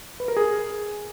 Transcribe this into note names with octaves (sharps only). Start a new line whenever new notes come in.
B4
A#4
G#4